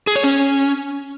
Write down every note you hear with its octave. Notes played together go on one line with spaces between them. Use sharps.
G#4
C#5
C#4